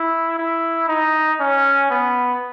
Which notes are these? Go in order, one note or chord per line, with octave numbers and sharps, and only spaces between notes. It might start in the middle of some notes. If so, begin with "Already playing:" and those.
Already playing: E4
E4
D#4
C#4
B3